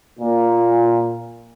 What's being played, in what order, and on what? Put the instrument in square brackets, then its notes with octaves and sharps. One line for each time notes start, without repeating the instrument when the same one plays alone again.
[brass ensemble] A#2